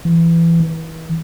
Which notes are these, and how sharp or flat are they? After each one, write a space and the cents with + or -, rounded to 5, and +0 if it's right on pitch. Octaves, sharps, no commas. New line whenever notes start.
E3 +20
E3 -35